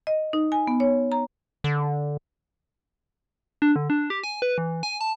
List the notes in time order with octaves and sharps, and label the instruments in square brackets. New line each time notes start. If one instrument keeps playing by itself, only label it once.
[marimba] D#5
D#4
G#5
B3
C#5
A#5
[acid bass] D3
[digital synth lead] D4
D3
D4
G4
G#5
B4
E3
G#5
A5